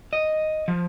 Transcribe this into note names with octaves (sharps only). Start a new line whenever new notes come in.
D#5
F3